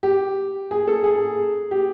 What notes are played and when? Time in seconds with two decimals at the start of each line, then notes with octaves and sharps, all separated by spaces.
0.03 G4
0.71 G#4
0.87 A4
1.04 G#4
1.71 G4